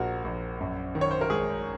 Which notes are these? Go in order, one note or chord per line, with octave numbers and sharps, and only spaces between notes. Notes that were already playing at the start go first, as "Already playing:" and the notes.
Already playing: A#1 A#2 F3 F#4 A#4
A#1
F#2
D#3
C#5
C5
A#4
G#1 G#4